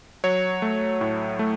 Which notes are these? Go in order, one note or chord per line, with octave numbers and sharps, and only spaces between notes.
F#3 C#5
A3
A2
A3